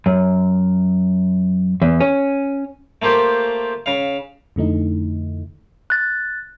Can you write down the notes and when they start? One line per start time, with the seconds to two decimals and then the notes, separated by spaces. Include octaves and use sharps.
0.06 F#2
1.82 E2
2.00 C#4
3.02 A3 A#3 F4 G4 C5
3.86 C#3 F5
4.56 F2 D3 A3 D#4 E4
5.90 F#6 A6